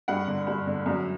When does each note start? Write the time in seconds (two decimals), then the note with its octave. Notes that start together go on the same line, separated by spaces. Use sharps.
0.08 G2 F#5
0.28 D3
0.47 G2
0.67 D3
0.86 F#2